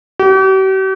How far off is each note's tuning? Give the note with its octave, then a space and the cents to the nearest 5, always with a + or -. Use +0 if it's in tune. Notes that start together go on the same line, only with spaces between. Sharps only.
G4 -45